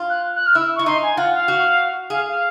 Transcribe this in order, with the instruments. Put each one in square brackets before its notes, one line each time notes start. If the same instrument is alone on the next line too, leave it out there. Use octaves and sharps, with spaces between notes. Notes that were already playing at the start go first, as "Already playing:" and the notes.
Already playing: [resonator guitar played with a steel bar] F4
[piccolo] F#6
F#6
F6
[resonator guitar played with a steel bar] E4 [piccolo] E6
[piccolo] C#6
[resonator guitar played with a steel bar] E4
[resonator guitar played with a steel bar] D#4 [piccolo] C6
[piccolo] G#5
[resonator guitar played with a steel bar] F4 [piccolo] F#5
[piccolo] F5
[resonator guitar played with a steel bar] F#4
[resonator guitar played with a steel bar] G#4 [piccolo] F5
[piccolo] F5